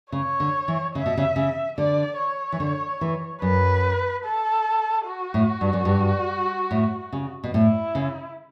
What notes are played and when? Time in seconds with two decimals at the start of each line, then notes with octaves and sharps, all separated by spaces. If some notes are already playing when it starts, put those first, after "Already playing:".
0.12 C#3 C#5
0.40 D3
0.68 E3
0.95 C#3 E5
1.06 B2
1.17 C#3
1.36 C#3
1.77 D3 D5
2.18 C#5
2.52 E3
2.60 D3
3.01 E3
3.42 F#2 B4
4.25 A4
5.07 F#4
5.34 A2
5.61 G2
5.73 F#2
5.85 G2
6.71 A2
7.13 C#3
7.44 B2
7.54 A2 E4
7.95 C#3